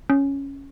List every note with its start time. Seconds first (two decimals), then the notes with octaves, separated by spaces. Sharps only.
0.10 C#4